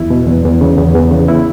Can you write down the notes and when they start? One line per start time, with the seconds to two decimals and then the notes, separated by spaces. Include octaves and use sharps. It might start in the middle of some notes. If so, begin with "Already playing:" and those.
Already playing: E2 E4
0.10 B2
0.27 E2
0.44 E2
0.61 C#3
0.78 E2
0.94 E2
1.11 C#3
1.28 E4